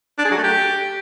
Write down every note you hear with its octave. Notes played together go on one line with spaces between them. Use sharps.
D4
G#4
F#3
A3
G4